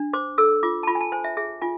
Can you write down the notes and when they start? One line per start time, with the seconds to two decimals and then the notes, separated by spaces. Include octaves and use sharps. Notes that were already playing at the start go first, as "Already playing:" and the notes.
Already playing: D4
0.13 C5 D6
0.38 A4 E6
0.63 F4 D6
0.83 A5
0.87 F4 B5
0.95 G#5
1.01 A5
1.12 C5 G#5
1.24 E5
1.37 G#4 E5
1.61 F4 G#5